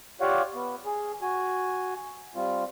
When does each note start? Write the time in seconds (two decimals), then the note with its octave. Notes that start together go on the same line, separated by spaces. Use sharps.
0.21 F4 G4 C#5 D5 F5 F#5
0.55 B3
0.85 G#4
1.22 F#4 G#5
2.35 G3 C4 F4